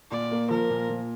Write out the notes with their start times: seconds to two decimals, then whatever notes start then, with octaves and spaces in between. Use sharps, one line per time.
0.11 A#2 D5
0.31 A#3
0.50 F3 A#4
0.70 A#2
0.89 A#2